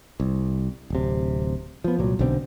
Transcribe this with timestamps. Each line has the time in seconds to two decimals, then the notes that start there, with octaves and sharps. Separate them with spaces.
0.20 C2
0.90 D1 C3
1.84 F3 B3
1.98 C2 A#2 F#3
2.19 B1 B2 D3 C4